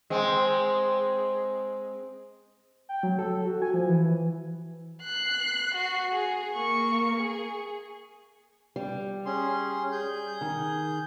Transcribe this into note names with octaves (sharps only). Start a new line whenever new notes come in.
G#3 C4
G5
F#3
A4
F#4
G#5
F3
E3
F#6 C7
F#4 C7
G#4
A#3 C#6
G#4
G3
C#4 G#4 C6
G#4 G6
D#3